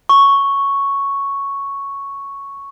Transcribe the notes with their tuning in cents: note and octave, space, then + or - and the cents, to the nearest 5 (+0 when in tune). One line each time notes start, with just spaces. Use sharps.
C#6 +0